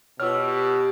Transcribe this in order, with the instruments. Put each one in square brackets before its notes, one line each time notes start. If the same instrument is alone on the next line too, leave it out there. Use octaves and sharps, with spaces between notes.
[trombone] B2 [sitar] G3 [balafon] F4 B4 C#5 [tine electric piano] E6 F6